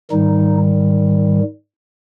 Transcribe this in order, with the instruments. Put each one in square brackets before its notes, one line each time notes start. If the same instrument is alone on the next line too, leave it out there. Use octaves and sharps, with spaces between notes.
[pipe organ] G#2 D#3 G3 D#4